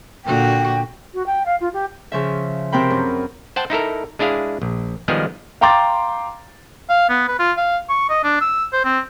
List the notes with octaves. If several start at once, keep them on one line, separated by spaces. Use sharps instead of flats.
A#2 D3 F#4 G5
F#4
G5
F5
F4
G4
C#3 F3 E5
C3 C4 A#4 G5 B5
F#2
C5 F#5 G5 A5
D#4 E4 A4 A#4
G#3 D4 E4 G#4 F5
A#1
D#3 F3 G3 G#3 B3 G#4
F5 G5 A#5 C6 D6 A6
F5
B3
B4
F4
F5
C#6
D#5
D4
E6
C5
C4